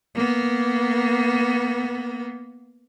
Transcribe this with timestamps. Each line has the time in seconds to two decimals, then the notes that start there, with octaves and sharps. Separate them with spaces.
0.15 A#3 B3